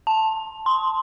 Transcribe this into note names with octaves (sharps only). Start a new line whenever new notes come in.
A5
C6